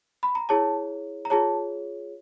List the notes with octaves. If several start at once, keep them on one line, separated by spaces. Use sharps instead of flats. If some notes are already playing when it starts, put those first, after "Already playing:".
B5
A#5
E4 G#4 C#5 A5
A#5
F4 G#4 C#5 A5